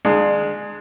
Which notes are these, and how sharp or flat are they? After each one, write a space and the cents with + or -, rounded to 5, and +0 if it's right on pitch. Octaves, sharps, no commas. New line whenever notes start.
G#3 +10 D4 +35 F5 +0